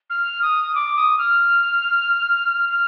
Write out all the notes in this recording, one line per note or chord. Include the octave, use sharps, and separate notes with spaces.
F6
D#6
D6
D#6
F6
F6